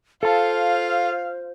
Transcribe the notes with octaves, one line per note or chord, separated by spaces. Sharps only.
F4 A4 C5 F5 A5